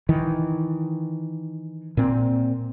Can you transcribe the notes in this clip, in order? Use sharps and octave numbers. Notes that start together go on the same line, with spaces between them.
D#3 E3
A#2 C4